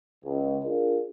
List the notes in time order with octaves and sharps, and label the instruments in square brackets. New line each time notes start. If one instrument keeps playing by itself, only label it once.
[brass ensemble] C#2
D4 F4 G#4 A#4